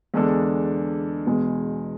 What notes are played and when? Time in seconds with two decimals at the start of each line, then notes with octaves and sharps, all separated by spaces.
0.14 E2 D3 G#3 D4 A4
1.26 E2 B2 G#3